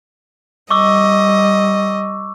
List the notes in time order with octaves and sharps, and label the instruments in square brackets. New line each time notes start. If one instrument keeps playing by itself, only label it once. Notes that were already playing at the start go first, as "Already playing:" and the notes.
[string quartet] G3 D#5 [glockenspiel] C#6 D6 E6